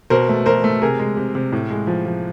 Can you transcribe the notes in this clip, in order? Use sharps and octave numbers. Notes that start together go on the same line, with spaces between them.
B2 A#4 C5
A3
B2 A#4 C5
A3
C3 G#4 A#4
G#3
C3
C3
A2
G#3
F3
F3